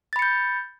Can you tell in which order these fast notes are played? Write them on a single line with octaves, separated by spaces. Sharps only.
A6 B5 C#7 G6